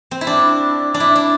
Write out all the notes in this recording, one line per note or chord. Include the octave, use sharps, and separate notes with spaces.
C4
E4
D4
D4
E4
D4